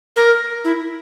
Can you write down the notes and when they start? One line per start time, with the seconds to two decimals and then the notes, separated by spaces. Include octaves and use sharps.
0.16 A#4
0.65 E4